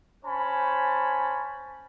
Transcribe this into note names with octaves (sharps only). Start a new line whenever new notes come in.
C#4 C5 G#5 A5 B5